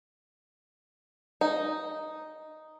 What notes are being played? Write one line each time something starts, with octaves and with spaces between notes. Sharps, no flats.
D#4